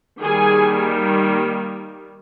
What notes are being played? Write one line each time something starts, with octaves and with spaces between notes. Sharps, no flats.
D#3 G3 A#3 G#4 G#5